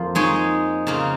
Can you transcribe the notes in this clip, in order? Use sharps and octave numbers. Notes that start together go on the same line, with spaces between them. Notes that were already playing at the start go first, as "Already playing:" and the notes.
Already playing: F2 A#3 F4
G#3 D#4 G#4 C#5
C#3 A#3 F4